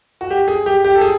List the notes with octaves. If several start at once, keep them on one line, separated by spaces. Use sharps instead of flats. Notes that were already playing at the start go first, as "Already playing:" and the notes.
F#4
G4
G#4
G4
G4
A4
G#4